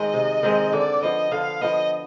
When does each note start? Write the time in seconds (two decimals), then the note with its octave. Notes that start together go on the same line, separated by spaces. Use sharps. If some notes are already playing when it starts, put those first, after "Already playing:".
Already playing: D#3 G#3 C4 D#5
0.14 C3
0.43 D#3 G#3 C4
0.73 D3 D5
1.03 F3 B3 D#5
1.31 D3 F5
1.62 F3 B3 D#5